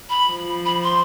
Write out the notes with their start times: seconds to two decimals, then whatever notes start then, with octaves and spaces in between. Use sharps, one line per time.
0.09 B5
0.29 F3
0.65 B5
0.83 C6